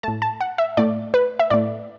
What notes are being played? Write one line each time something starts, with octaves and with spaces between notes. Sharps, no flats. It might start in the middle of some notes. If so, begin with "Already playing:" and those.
A2 A3 A5
A5
F#5
E5
A2 A3 D5
B4
E5
A2 A3 D5